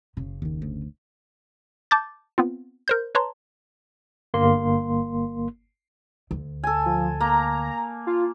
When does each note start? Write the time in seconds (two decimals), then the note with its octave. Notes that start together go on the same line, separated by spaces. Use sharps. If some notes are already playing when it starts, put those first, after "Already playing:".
0.17 F#1 C#3
0.42 D#2 D#3
0.62 D2
1.91 A5 D6 G6 A6
2.38 B3 C4 F4
2.88 A#4 C5 G6
3.15 B4 C#5 A5 A#5 C6
4.34 G1 A#3 C6
6.31 D2
6.64 A4 G#5
6.86 F3
7.21 A#3 A#5
8.07 F4